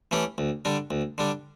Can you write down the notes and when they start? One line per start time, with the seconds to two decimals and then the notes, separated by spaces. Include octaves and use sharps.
0.11 E3 A3 C#4 G4
0.38 D2
0.65 D3 G3 D4
0.91 D2
1.18 D3 G3 D4